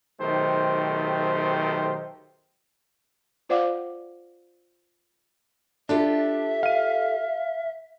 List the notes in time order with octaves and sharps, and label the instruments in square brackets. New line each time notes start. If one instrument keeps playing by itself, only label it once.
[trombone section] B1 D#3 A3 G4 C5
[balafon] F4 C5 D5 F5 F#5 D6
[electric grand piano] D4 [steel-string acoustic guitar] F4 G4 A4 [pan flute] E5
[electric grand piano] F5 D#7